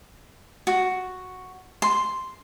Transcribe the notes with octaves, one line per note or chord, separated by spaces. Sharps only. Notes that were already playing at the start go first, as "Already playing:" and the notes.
F#4
C6